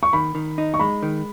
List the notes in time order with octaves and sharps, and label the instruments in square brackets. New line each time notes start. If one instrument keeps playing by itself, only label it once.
[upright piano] C#6
[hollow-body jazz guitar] D#3 [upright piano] B5
[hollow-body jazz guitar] D#3
D#4
[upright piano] C#6
[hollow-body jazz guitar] G#3 [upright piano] B5
[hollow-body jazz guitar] D#3